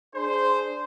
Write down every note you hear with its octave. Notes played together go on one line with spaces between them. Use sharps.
D4 G#4 C5